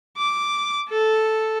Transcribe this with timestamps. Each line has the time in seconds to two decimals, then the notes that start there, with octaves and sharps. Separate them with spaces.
0.17 D6
0.89 A4